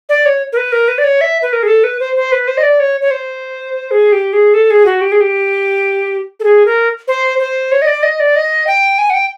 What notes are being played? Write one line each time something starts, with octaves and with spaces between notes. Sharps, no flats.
D5
C#5
A#4
B4
A#4
B4
D5
C#5
E5
B4
A#4
G#4
A4
B4
C5
C5
B4
C5
D#5
D5
C#5
C#5
C5
G#4
G4
G#4
A4
G#4
F#4
G4
G#4
G4
A4
G#4
A#4
C5
C5
C#5
D#5
D5
D#5
D5
D#5
G5
G#5
F#5
G5